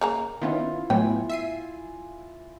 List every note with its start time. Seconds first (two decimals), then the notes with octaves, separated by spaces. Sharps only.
0.01 C#3 A#3 A#5
0.41 D#3 B3 C#4 E4 F4
0.90 A2 F#3 B3 G5 G#5
1.30 E5 C7 D#7